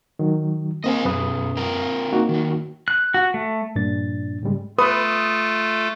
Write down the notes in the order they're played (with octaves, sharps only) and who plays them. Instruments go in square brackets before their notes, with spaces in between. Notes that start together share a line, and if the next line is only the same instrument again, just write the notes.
[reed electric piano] D#3 F#3
[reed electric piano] A#3 C4 A#4 [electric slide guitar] D#5 F5 G#5
[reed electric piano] F#2 B4 D#6 [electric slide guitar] B2 C#4
[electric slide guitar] C4 F4 A#4
[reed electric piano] A#3 D#4 F#4
[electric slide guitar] D#3 F#3
[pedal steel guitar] F#6
F#4
A3
[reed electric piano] G2 A#2 F3 D4 A6
G#2 C#3 G3 G#3
[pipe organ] A3 F4 A4 [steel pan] B4 [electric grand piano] D#6